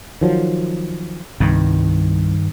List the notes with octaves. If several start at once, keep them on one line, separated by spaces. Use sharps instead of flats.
D#3 F3 F#3
C2 G2 D#3